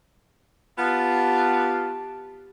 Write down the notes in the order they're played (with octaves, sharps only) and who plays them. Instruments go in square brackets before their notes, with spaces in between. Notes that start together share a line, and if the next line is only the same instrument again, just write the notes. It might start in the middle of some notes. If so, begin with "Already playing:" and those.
[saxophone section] B3 F4 [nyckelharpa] G4 A5